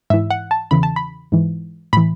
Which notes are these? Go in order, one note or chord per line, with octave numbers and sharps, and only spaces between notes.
G#2 E3 E5
F#5
A5
E2 C#3 E3 B5
A5
B5
G#2 E3
A2 E3 B5